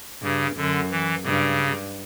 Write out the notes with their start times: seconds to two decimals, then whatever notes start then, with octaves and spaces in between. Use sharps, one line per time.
0.22 G2 C#3
0.56 F#2 D3
0.91 E3
1.24 G2 C#3